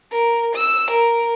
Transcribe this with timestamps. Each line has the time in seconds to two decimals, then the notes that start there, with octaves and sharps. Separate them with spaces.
0.11 A#4
0.55 E6
0.91 A#4